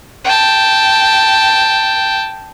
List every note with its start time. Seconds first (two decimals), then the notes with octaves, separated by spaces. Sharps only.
0.25 G5 A5